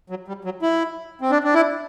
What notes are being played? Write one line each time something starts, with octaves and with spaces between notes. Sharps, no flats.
F#3
G3
F#3
E4
C4
D4
D4
E4